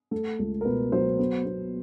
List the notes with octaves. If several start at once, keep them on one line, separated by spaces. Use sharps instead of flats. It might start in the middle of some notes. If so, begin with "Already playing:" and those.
A3 A4
C#2
A#4
B2 B4
F#3 C5
B3
B3